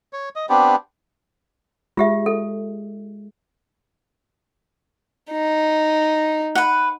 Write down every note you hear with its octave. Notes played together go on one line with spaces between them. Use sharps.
C#5
D#5
B3 C4 D4 G4
G#3 F4 G4 E5
A4
D#4
B4 F#5